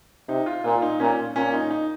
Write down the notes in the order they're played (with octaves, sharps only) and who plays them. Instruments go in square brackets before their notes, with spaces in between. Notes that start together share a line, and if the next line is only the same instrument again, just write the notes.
[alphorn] C3 [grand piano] D#4
[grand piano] F4
[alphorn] A#2 [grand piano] F4
[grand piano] D#4
[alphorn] A#2 [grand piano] C#4
[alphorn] A#2 [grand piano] C#4
[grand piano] D#4
D#4